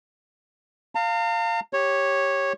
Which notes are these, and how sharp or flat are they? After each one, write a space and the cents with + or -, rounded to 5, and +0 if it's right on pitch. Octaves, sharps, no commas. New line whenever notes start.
F5 +0 A#5 -45
G4 +0 C#5 -10